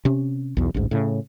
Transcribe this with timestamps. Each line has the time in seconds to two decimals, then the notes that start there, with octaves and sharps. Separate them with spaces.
0.05 C3 C#4
0.57 B1 E2
0.74 A1 D2 G#2
0.91 A2 C#3